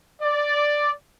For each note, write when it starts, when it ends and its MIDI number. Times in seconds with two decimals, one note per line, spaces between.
0.22 0.91 74